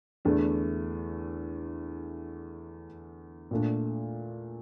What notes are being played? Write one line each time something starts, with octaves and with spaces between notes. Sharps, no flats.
E2 D3 A3 D4
A#2 A3 D4